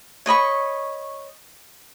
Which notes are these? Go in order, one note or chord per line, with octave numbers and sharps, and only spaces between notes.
C#5 D#5 B5 C#6